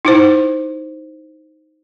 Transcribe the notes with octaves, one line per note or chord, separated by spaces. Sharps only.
D#4 E4 C5